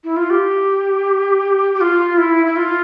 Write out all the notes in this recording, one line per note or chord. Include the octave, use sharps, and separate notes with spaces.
E4
F4
G4
G4
F4
E4
E4
F4